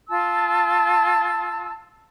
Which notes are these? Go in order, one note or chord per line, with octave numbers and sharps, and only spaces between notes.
F4 A5 E6